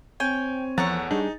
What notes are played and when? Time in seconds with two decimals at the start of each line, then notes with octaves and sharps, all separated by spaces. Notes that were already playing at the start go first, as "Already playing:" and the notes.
0.20 C4 C#5 G5 G#5 G#6
0.78 E2 F3 A3 C#5 F#5 A#5 A6
1.11 G3 D4 D#4 G#4